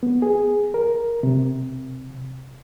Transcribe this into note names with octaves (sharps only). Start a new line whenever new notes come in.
B3
G#4
A#4
C3